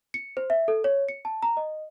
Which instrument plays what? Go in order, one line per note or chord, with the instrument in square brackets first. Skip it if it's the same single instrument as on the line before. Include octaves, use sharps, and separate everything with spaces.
[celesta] C#7
C5
E5
A4
C#5
C#7
A5
A#5
D#5